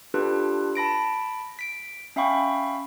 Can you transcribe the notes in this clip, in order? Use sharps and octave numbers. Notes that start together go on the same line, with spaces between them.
D4 F4 G4 A4 B4
A5 B5 A#6 D7
B6 D7
C#4 E5 F5 G5 B5 C#6